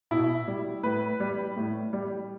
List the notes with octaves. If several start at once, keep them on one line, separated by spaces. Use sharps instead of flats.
B2 E4
G3
A2 B4
G3
A2
G3